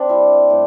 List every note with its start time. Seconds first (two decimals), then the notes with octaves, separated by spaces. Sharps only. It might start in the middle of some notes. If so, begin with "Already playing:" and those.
Already playing: C4 D4
0.09 G3 E4
0.50 A2